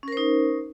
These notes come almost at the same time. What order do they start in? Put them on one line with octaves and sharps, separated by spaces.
C#4 A#4 C5 D#4